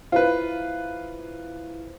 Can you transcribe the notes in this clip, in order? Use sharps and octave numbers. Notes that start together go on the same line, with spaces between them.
E4 F4 B4 C5